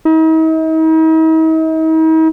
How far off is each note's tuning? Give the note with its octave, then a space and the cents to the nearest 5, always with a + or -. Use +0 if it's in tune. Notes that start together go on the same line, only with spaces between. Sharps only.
D#4 +45